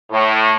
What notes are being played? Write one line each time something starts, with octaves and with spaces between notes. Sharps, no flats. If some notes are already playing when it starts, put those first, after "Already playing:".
A2